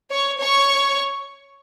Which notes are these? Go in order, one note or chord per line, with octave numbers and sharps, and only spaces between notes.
C#5 C#6
C#5 C#6